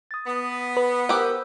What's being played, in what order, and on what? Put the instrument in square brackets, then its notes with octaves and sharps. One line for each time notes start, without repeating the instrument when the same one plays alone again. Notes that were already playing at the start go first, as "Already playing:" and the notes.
[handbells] D#6 A6
[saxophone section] B3
[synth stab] B4
[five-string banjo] G4 F#5 [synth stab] A#4 [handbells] C5 E6